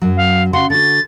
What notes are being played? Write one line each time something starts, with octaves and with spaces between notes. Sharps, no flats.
F#2 F#3
F5
C#3 F#4 F#5 C6
D3 F#4 A6